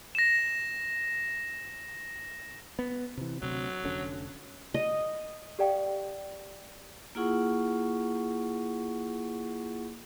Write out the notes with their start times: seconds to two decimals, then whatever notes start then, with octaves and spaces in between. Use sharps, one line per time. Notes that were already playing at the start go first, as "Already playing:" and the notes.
0.15 A#6 E7
2.79 B3
3.17 C3 E3
3.41 D2 C3 F#3
3.84 F1 D3 C#4
4.74 D#5
5.59 G4 A4 D5 F5 G5
7.15 A#3 E4 F4 G#4 F#5 C#6